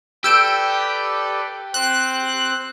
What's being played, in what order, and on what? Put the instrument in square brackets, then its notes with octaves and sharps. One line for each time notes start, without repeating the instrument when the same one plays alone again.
[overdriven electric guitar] G4 [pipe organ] A4 B4 D5 [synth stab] E6 G6 D7
[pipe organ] C4 C5 [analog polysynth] F#6